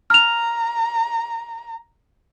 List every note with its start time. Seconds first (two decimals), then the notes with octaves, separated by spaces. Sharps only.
0.10 A#5 F6 F7